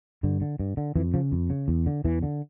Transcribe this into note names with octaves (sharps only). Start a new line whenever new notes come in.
G2 D3
D3
G2
D3
F2 E3
C#3 F3
F2
C#3
E2
D3
E2 E3
D3